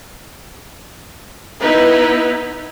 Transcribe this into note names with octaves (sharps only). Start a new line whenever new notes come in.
B3 D#4 E4 B4